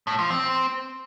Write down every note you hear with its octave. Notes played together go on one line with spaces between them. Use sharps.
A2
F3
C4